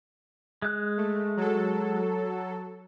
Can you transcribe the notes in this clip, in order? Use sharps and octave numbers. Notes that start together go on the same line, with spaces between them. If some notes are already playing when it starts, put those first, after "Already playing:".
G#3 F#6
A3
F#3 A4